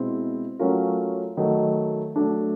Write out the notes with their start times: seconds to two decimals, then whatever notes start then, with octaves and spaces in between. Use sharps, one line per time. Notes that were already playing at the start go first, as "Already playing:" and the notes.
Already playing: B2 G#3 C4 E4
0.59 F#3 A3 C#4 F4 A#4
1.37 D#3 F#3 A3
2.16 F#3 A3 D4